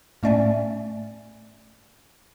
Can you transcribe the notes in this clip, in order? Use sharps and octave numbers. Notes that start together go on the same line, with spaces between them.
A2 A3 C#4 D5 E5 G#5